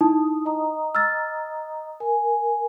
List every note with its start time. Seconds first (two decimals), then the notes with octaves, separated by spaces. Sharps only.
0.01 D#4 E4 A5 D#6
0.45 D#5 A#5 D#6
0.95 E6 F6 A6
2.00 A#4 G#5